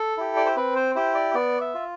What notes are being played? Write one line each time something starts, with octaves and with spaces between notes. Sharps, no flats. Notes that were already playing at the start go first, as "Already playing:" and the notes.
Already playing: A4
E4 G4
D5
C5
C4 B4
C5
E4 G4 C5
D5
B3 D5
E5
F4